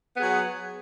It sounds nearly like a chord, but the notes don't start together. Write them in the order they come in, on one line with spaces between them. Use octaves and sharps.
B3 G#4 F#3